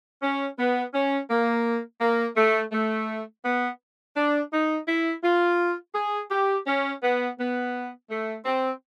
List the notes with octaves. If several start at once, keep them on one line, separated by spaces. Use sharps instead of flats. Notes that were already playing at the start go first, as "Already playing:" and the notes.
C#4
B3
C#4
A#3
A#3
A3
A3
B3
D4
D#4
E4
F4
G#4
G4
C#4
B3
B3
A3
C4